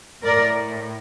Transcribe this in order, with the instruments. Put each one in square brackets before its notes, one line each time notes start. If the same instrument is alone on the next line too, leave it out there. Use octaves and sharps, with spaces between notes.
[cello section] A2 A#4 D5